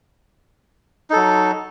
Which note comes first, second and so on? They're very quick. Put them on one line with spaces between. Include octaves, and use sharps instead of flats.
D#4 A4 F#3